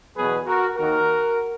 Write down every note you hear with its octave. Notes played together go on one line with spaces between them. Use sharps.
E2 B2 F#3 B3 G#4 B4
F#4 A#4
D#2 D#3 A#3 F#4 A#4